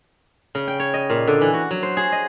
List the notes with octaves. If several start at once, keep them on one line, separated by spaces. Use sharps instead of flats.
C#3
G5
C#5
D#5
A#2
D3
E3
F#4
F#3
C5
G#4
D#5